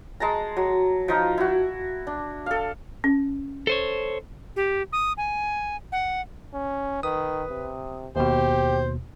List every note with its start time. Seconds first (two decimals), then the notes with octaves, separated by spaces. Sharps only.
0.20 G#3 A5 A#5
0.57 F#3
1.08 F3 D#4 F4
1.38 E4 F#4
2.07 D4
2.46 A4 F5
3.04 C#4
3.67 A4 C5 C#5
4.56 G4
4.93 D#6
5.17 G#5
5.92 F#5
6.54 C#4
7.03 D#3 B4 D#6
7.50 C3
8.16 D#2 B2 G4 C5